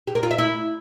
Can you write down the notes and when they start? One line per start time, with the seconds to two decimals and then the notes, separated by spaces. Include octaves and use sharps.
0.07 G4
0.15 A#4
0.23 F4
0.31 E5
0.38 E4